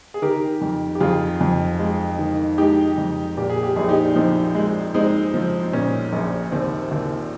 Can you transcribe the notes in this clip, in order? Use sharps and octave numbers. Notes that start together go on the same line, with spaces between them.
G#4
D#3 G4 A#4
F2
G4
F2 F4 G#4
F2
G#3
D#3
G#3 D#4 G4
F2
A#2 G4
G#4
G4
A#1 G#4
D#4 G4
F3 C4 D#4
G#3
G#3 C4 D#4
F3
A#2 C#4
A#1
D#2 C4
D#2